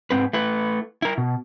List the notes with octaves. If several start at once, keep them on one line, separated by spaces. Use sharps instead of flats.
G#2 C4 B4
A3 E4 B4
E4 A#4
B2